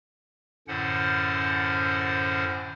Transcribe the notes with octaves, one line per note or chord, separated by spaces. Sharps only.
F#2 A2 D3 C#4 C5 F#5